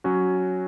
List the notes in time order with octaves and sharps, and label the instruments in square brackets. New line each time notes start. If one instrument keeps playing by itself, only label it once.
[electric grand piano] F#3 C#4 F#4